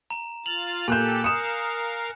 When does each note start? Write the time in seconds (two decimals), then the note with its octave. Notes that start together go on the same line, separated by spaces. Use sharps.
0.10 A#5 E7
0.46 F4 F6 A6 F7 F#7
0.88 A#2 G4 A4 G#5 F#6 G6 E7
1.24 A#4 F5 D#6 C#7 E7